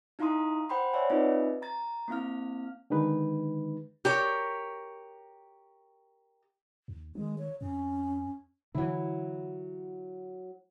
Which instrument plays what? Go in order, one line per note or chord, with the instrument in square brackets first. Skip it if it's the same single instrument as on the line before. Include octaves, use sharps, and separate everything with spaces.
[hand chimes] D#4 E4 F5 A#5 C6 D#6
C5 F#5 G5 B5 C6
C#5 D5 E5 F#5 G#5
C4 D#4 F4 B4 D#5 E5
A#5 A6
A#3 C4 E4 F5 F6
[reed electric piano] D3 D#3 G#3 D#4 B4
[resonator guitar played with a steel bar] G4 A#4 C#5
[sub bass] D#2
[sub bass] D#3 [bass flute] G#3
[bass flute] C#5
[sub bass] F2 [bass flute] C#4
[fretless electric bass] D3 E3 [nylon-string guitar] F#3 E4